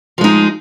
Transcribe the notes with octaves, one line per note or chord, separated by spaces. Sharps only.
F3 G#3 D#4